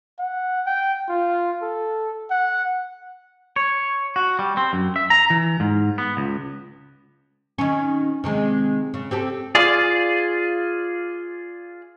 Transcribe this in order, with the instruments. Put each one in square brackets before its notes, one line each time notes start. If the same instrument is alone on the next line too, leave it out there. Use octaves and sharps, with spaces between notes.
[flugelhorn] F#5
G5
F4
A4
F#5
[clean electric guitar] C#5
F#4
G3
C4
F#2
E5
A#5
E3
G#2
B3
C#2
[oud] D#3 C#4
C3 D#3 G#3
C#3
C4 G4 A4
[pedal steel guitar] F4 G#4 D5